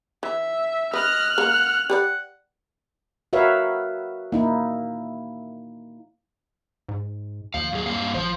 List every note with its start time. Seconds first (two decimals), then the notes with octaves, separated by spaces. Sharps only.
0.23 E3 E5
0.93 B4 D#5 F6 F#6
1.38 C#3 G#3 A#3 F#5
1.90 G4 B4 D5 F#5
3.33 F#4 A#4 B4 C#5 E5 F5
4.32 A#3 D#4 E4
6.89 G#2
7.54 D#2 F3 F5
7.72 F#2 G#4
7.86 G2 A#3 F5
8.14 A1 F3 C5